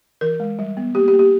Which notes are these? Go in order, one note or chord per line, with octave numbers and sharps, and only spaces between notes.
E3 A#4
G#3
G3
B3
A#3 G4
G4
A#3
G4